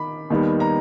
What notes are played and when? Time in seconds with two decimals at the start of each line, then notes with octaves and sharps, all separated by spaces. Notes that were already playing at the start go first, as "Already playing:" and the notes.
Already playing: D#3 B5 D6
0.30 D#2 D#3 G3 B3 D#4
0.60 A#5